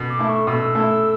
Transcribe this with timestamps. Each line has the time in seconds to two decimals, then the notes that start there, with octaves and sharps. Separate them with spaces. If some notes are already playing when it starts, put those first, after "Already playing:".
Already playing: B2
0.09 D6
0.19 A3 E4
0.28 C#6
0.47 B2 E6
0.75 A3 E4